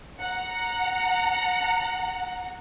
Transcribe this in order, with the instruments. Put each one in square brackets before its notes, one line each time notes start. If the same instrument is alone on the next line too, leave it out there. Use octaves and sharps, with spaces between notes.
[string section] F#5 A#5